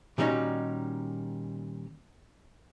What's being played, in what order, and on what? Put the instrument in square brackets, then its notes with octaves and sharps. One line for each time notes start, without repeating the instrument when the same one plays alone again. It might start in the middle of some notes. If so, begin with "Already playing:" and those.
[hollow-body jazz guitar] A#2 D#3 G3 C#4 D#4 F#4